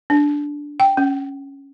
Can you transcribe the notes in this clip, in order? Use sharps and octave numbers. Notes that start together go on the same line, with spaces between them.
D4
G5
C#4